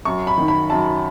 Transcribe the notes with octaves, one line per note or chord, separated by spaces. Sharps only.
F#2 C#6
B5
D#3
B5
F#2 A5